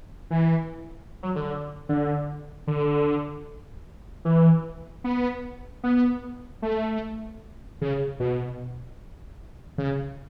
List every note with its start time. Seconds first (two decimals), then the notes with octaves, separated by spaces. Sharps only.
0.31 E3
1.23 F#3
1.36 D3
1.89 D3
2.67 D3
4.25 E3
5.04 B3
5.84 B3
6.62 A3
7.81 C#3
8.20 B2
9.78 C#3